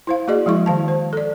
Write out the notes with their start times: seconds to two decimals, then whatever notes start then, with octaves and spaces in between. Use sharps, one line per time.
0.07 E4 C5 F5
0.28 A#3 F#4 G#4 D5 D#5
0.46 F3 G#3 E4 C#6
0.66 D#3 F5 A5
0.88 C5
1.13 A4 D5